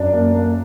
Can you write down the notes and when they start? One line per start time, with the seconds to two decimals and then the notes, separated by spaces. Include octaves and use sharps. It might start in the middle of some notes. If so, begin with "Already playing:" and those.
Already playing: F#2 D4
0.12 A#3
0.35 A#3